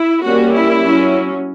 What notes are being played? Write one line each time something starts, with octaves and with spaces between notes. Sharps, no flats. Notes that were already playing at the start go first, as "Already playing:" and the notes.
Already playing: E4
G3 A#3 C#4 F#4
E4
F#3 C#4